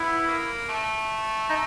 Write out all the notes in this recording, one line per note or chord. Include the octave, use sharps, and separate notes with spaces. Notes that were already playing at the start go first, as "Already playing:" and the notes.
Already playing: B3 E4
A#3
A3
D#4